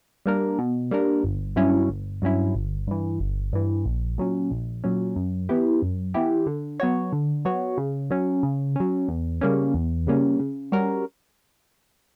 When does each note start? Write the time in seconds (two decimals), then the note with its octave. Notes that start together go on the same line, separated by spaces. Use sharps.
0.26 G3 A#3 D4 A#4
0.59 B2
0.91 G3 A#3 D4 A#4
1.24 G1
1.56 G2 F#3 C#4 E4
1.89 G1
2.22 G2 F#3 C#4 E4
2.55 G1
2.87 G2 E3
3.19 G1
3.53 G2 E3
3.86 A#1
4.18 A#2 F#3 C#4
4.50 A#1
4.84 A#2 F#3 C#4
5.16 F#2
5.49 E3 B3 E4 G4
5.82 F#2
6.14 E3 B3 E4 G4
6.46 D3
6.80 F#3 B3 F#4 C#5
7.13 D3
7.45 F#3 B3 F#4 C#5
7.78 C#3
8.10 F#3 C#4
8.43 C#3
8.76 F#3 C#4
9.08 E2
9.41 C#3 G3 A#3 C#4
9.74 E2
10.07 C#3 G3 A#3 C#4
10.40 C#3
10.72 G3 C#4 F#4 A#4